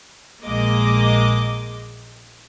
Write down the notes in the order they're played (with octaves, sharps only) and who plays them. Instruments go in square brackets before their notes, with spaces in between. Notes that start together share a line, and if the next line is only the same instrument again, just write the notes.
[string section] A#1 G#3 A#3 D#5 D6